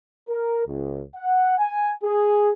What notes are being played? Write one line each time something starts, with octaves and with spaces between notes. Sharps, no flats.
A#4
C#2
F#5
G#5
G#4